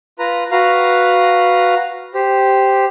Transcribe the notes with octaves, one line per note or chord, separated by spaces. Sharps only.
F4 B4 A#5
F#4 B4 F5 A#5
G4 C5